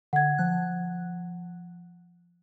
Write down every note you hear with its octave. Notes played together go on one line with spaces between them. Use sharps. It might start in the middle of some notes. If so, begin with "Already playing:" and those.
D3 F#5 G#6
F3 F#6